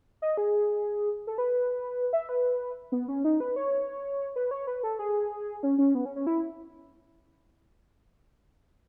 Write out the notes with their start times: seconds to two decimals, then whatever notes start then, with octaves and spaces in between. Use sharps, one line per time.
0.22 D#5
0.37 G#4
1.27 A4
1.38 B4
2.13 E5
2.29 B4
2.92 B3
3.08 C#4
3.24 D#4
3.40 B4
3.56 C#5
4.36 B4
4.51 C#5
4.67 B4
4.83 A4
4.99 G#4
5.63 C#4
5.78 C#4
5.95 B3
6.05 C#4
6.16 C#4
6.27 E4